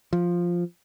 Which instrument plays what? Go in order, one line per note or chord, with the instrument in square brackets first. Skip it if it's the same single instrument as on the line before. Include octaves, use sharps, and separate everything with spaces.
[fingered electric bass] F3